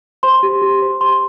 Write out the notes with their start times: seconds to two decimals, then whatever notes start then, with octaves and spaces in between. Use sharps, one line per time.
0.23 C5 C6
0.43 G4
0.62 G4
0.82 C5
1.01 C5 C6